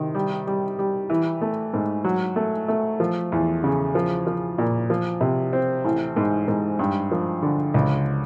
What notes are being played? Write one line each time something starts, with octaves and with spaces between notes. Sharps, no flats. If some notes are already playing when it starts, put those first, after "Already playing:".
Already playing: C3 D#3
G3
G3
G3
E3
A3
G#2
F#3
A3
A3
F3
E2
C#3
F3
F3
A#2
F3
C3
C4
A1
G#2
G#2
G2
F3
D3
C#2